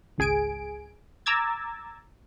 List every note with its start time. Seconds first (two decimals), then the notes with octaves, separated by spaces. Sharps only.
0.18 G#1 C#2 G#4 G#5 D7
1.26 A#5 D6 E6 G#6 A6